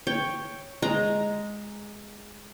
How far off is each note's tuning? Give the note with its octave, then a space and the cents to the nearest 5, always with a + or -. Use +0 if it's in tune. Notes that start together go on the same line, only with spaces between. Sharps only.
C#5 +0 G5 +5
G#3 +0 A#5 +0